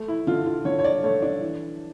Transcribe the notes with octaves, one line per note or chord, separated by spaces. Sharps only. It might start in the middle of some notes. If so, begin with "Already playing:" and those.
Already playing: A3
E4
D3 F4
F4
D3 C#5
C#5
D5
A3 C#5
D4
E3